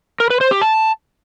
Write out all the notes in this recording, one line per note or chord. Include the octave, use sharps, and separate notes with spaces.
A#4
B4
C5
G4
A5